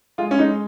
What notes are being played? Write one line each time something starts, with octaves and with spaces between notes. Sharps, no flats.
G#3 F4
C#4
G#3 D#4